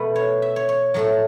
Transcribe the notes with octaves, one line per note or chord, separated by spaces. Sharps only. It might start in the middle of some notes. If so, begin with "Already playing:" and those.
Already playing: B2 A3 B4
C#5
E5
C#5
C#5
A2 F#3 A3 A4